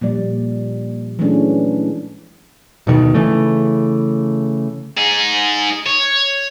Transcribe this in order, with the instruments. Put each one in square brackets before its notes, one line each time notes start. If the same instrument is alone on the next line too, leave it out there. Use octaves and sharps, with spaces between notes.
[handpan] A#2 F3 G3 D5
E3 F#3 G#3 A3 C#4 D4
[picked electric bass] D1 B2 D3 D#3
C#3 E3 A3
[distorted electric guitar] D#4 G#4
C#5